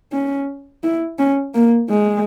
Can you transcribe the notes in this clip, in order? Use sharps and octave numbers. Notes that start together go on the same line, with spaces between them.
C#4
E4
C#4
A#3
G#3